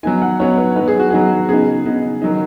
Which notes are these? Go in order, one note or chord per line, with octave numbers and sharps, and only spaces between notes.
F#3 B3 D#4 G#5
F#5
F#3 B3 D#4 C#5
B4
F#3 B3 D#4 B4
G#4
F#4
F#3 B3 D#4 G#4
C#3 B3 D#4 G#4
C#3 B3 D#4
D#3 F#3 D#4